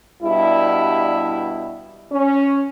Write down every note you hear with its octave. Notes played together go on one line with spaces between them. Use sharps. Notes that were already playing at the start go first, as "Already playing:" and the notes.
G2 B2 G3 E4
C#4